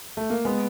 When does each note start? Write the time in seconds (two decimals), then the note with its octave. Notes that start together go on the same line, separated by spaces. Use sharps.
0.17 A3
0.30 A#3
0.45 G#3 B3